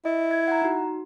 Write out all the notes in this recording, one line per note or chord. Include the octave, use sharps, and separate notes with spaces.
E4 D#5
G#6
F#5 A#5
D#4 F#4